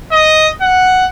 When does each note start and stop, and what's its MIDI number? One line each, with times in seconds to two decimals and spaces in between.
0.12 0.49 75
0.62 1.06 78